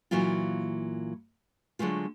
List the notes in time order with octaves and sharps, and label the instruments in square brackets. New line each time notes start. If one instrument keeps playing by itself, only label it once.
[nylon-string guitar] A#2 E3 F#3 A#3 E4 F4
D3 F#3 G#3 A3 F4